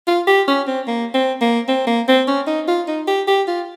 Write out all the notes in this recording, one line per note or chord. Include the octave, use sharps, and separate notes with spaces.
F4
G4
C#4
C4
A#3
C4
A#3
C4
A#3
C4
C#4
D#4
F4
D#4
G4
G4
F4